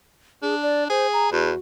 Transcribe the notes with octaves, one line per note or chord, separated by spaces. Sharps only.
D4 G#4
D5
G#4 C5
A#5
E2 F#4